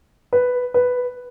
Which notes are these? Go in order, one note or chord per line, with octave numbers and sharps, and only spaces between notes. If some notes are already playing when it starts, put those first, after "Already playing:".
B4
B4